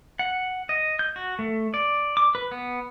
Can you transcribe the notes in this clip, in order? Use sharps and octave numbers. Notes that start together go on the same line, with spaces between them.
F#5
D#5
G6
F#4
A3
D5
D6
B4
B3